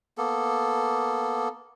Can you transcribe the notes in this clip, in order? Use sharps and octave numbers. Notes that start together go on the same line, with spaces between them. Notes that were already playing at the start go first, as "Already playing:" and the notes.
A#3 B3 A4